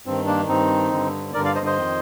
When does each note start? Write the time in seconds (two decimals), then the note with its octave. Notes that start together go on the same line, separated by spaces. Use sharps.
0.06 G2 D#3 C4
0.27 A#3 D4
0.48 G2 D#3 C4 D#4
0.92 G2 D3
1.34 G2 D3 A#4 D5
1.44 D5 F5
1.55 C5 D#5
1.66 C5 D#5
1.77 F2 D#3